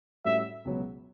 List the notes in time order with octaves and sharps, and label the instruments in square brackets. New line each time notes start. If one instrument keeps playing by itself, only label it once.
[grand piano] A2 G3 C#4 F#4 [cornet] E5
[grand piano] C#2 B2 F#3 B3